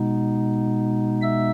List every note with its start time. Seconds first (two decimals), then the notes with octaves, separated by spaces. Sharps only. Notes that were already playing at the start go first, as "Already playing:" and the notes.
Already playing: B2 G#3 B3 D#4
1.22 E5 E6